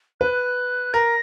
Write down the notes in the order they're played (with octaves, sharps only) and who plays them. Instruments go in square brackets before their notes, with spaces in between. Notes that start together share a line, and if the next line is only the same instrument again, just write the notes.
[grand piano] B4 [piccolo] F#6
[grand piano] A#4 [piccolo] A#6